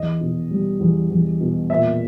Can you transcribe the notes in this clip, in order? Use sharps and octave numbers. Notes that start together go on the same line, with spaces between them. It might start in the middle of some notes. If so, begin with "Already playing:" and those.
Already playing: E2 D#5
B2
G3
E2
E2
B2
A#2 E5